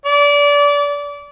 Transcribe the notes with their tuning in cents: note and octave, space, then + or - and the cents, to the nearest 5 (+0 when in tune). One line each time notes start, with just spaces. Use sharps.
D5 -25